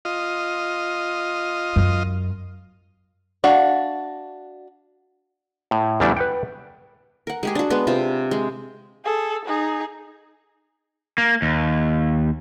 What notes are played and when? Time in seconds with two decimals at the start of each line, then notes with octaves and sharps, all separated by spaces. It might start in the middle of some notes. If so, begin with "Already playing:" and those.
0.05 F4 D#5
1.76 F#2
3.44 D4 F#4 E5 F5
5.71 A2
6.00 E2 C#3 G3 A3 D4 E4
6.17 B4 F#5 G5
7.27 A#4 F#5
7.43 G#3 G4 G#4
7.55 D4 F#4
7.70 G#3 B3 B4
7.87 C3 F4
8.31 G#3
9.05 G#4 A4
9.45 D#4 G#4
11.18 A#3
11.42 D#2